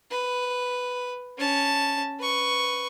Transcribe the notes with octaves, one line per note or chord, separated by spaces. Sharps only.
B4
C#4 A5
B4 C#6